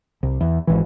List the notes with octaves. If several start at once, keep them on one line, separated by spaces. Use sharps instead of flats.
C2
E2
G#1 E3